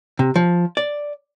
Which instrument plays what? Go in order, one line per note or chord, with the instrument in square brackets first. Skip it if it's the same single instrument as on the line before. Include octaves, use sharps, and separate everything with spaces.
[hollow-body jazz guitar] C3
F3
D5